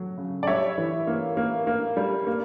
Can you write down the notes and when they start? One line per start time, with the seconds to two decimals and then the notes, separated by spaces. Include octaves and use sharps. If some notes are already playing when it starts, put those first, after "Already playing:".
Already playing: F#3
0.18 C#3
0.43 D5
0.47 G3 C#5 E5
0.78 E3
1.07 A#3
1.37 A#3
1.67 A#3
1.97 G3
2.27 A#3